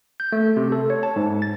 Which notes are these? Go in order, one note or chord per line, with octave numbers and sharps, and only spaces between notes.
G6
A3
C3
A4
C#5
A5
G#2
A6